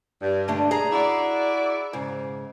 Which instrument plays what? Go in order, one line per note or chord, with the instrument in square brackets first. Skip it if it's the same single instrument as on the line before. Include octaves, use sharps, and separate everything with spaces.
[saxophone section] G2
[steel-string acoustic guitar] D3 A3 D4
G#4 A#5
[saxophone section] E4 F#4 D5
[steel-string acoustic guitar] G#2 C#3